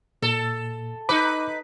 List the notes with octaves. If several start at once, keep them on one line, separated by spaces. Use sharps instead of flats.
A#2 A4
D#4 B4 B5 D6